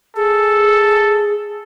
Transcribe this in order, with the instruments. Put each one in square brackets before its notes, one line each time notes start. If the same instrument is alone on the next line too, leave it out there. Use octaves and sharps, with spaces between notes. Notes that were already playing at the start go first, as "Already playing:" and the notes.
[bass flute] G#4 [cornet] A4